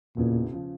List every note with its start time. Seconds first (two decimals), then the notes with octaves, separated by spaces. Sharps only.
0.17 E1 E2 A#2 C#3 E3
0.52 C#3 F3